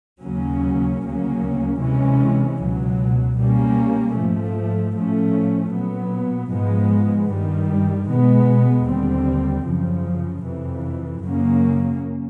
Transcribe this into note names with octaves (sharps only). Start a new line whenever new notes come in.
D#2 C#3 F#3 A#3 C#4
D2 C#3 F#3 A#3 C#4
C3 E3 G#3 C#4
C#2 B2 F#3
B2 G3 A#3 C#4
G#2 F3 A3
A2 F3 A3 C#4
A#2 F#3 B3
G#2 F3 G#3 B3
G2 D#3 G3
B2 G#3 B3
D#2 D3 G3 C4
F#2 C#3 F3
F2 C3 E3
F#2 C#3 F#3 A#3 C#4